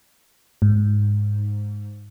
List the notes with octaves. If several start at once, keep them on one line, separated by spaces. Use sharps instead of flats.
G#2